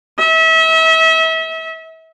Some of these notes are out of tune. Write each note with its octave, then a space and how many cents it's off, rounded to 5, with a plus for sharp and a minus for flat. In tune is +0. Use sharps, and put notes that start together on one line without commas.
E5 -35